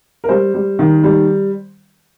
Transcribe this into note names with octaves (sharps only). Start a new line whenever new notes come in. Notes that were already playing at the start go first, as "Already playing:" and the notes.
A#4
G3 C5
G3
D#3
G3